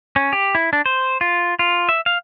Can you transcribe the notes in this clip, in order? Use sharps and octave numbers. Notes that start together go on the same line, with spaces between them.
C#4
G4
E4
D4
C5
F4
F4
E5
F5